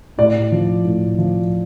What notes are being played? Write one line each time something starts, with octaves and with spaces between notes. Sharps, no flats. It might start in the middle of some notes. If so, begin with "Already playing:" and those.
A2 D5
F3
A2
F3